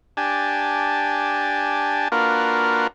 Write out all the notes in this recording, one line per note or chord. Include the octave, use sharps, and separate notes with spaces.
D4 G4 G#5 A5
A#3 D4 F4 F#4 A#4 B4